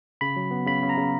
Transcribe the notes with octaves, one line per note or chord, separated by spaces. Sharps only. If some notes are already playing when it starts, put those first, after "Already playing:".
C#3 B5
F#3
B3
C#3 B5
C#3
A#5
C#3